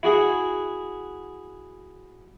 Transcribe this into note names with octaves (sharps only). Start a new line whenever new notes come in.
E4 F#4 G#4